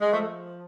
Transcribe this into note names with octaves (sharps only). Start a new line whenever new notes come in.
G#3
F3 A3